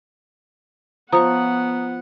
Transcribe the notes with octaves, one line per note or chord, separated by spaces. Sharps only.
F3 B3 C#5 F#5 A#5 C#6 D#6